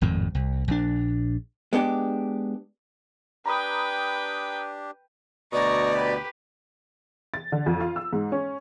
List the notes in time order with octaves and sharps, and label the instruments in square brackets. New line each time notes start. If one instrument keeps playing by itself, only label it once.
[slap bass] G#1 F2 A2
C2
A#1 D4
[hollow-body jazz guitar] G#3 B3 D4 G4
[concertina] D4 G4 [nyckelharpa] B4 G5 [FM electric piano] A#5 B5 D#6
[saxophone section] D2 B2 D#5 [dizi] D5 [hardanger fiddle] A#5 C#6
[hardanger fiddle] G4 B4
[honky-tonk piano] A6
D3
F2
F4
E6
G#2
C#4